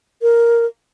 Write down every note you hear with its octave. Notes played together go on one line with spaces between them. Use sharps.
A#4